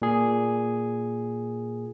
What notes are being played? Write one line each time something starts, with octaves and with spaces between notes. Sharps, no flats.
A#2 G#4